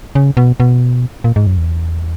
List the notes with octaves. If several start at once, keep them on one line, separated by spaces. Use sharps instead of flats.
C#3
B2
B2
A#2
G#2
F#2
E2